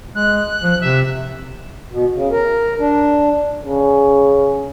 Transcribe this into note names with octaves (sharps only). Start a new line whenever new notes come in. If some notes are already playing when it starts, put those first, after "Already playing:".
G#3 F#6
F3
C3 E5
B2
C#3
A#4
D4
C#3